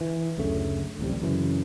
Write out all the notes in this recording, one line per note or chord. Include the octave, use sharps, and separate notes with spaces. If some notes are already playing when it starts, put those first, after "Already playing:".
E3
F#1 D2 C#3 A3
D1 A1 C3 G3
F#2 C#3 E3